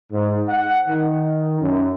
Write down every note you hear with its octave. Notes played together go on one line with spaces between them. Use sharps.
G#2
F#5
D#3
F#2